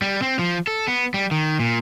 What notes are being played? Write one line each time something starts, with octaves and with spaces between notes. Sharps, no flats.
G3
C4
F3
A4
B3
G3
D#3
A#2